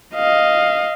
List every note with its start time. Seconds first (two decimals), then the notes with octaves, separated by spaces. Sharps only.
0.15 D#5 F5